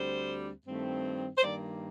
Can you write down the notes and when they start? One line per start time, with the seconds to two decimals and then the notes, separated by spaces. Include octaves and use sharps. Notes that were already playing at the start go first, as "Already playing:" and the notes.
Already playing: D2 D3 G3 C4 C5
0.65 G2 D#3 A3 C4
1.38 C5
1.43 G2 D#3 A#3 D5